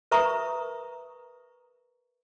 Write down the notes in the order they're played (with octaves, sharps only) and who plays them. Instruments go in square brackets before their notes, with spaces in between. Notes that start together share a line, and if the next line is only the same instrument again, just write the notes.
[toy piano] A#4 B4 E5 A#5 C#6 D#6